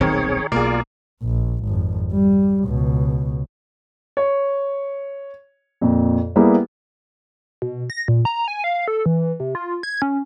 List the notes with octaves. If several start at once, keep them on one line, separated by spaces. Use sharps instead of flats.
D#1 B1 D#3 C4 G#4 C#5
B1 B2 A#3 F4 G#4 D5
A#1
G#1 F2
G3
C#2 B2
C#5
F2 A#2
G3 A#3 B3 E4 G4 G#4
B2
A#6
A#2
A#5
G#5
F5
A4
E3
C3
F4
G#6
C#4